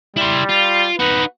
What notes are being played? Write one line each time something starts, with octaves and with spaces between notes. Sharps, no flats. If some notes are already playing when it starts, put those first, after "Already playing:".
G3 E4 C5
F4
D#4 F#4 B4